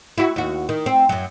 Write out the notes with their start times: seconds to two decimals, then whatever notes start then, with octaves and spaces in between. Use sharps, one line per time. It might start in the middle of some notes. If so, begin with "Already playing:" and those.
0.18 E4 F#4
0.36 D#2 F#4
0.69 D#3
0.86 C4
1.09 F#2 F#3